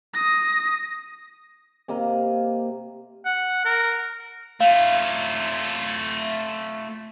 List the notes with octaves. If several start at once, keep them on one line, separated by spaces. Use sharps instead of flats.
D#6 A#6
C3 A#3 D#5
F#5
A#4
A3 F4 F5